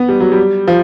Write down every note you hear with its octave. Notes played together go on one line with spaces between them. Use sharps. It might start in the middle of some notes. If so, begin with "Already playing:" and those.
Already playing: B3
G3
F#3
G3
F3